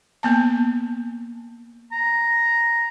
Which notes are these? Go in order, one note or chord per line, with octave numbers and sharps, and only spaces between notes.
A#3 B3 A5
A#5